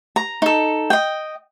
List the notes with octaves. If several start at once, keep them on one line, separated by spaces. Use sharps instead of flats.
A#5
D#4 A4
D#5 G5